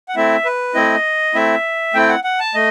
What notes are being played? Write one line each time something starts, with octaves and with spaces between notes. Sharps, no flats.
F#5
A3 C4 E4 E5
B4
A3 C4 E4 D#5
A3 C4 E4 E5
A3 C4 E4 G5
F#5
F#5
A5
A3 D#5